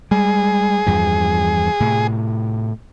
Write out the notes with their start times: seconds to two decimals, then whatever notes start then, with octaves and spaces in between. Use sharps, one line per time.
0.11 G3 G#3 G#4
0.86 E2 G2 F3
1.80 A2 C3